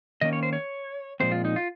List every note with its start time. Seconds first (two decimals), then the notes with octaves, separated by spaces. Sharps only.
0.21 D#3 A#3 C#4 D#5
0.33 C#5
0.43 C5
0.53 C#5
1.20 A#2 F3 G#3 C4 C5
1.32 F4
1.45 D#4
1.56 F4